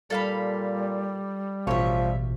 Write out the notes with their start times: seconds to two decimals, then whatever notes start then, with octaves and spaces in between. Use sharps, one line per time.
0.10 A#2 G3 A4 F5 B5
1.67 A1 B2 F3 C#5 E5